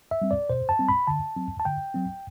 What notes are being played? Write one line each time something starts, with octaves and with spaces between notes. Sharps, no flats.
E5
G3 C4
D5
B2 C5
A5
G3 C4
B5
D3 A5
F#3 C4
A5
D3 G5
F#3 C4